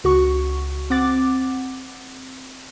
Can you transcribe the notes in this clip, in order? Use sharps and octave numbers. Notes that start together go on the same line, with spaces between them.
C#2 F#4 C#6
C4 F#5 D6 A6